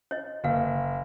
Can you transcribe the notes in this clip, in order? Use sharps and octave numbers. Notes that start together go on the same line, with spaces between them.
C#5 D#5
F#1 A#4 B4 F5